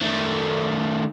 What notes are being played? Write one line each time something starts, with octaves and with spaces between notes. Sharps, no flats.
D#3 A3